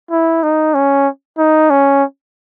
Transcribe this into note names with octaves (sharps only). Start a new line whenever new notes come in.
E4
D#4
C#4
D#4
C#4